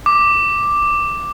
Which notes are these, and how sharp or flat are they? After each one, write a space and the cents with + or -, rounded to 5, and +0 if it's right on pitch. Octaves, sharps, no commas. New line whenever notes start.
D6 +5